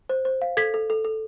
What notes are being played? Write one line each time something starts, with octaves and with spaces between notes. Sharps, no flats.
C5
C5
F5
A4 G#6 B6
A4
A4
A4